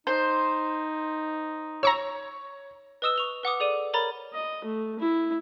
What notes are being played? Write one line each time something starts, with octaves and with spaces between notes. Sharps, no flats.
D#4 C5
C#5 A#5 C#6 E6
B4 D#5 D#6 E6 E7
C#6 F7 G7
B4 F#5 D6 D#6
G#4 A4 D5 D6 D#7
A#4 C#5 A#5 B5 A6
D#5
A3
E4